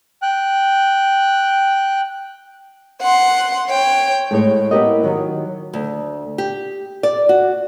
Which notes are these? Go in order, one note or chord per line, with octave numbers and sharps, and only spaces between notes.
G5 F#6
F#5 C6
C#5 G5
A2 G#3 C#5
B3 E4 F4 G4 A#4 D#5
D#3 F#3
D2
G4
D5
F#4